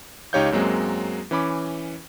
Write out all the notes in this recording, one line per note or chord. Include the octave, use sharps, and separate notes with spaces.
C#2 D#4 G4 C#5 F5 G6
F#2 F#3 G#3 A#3 C4
E3 C#4 B5 D6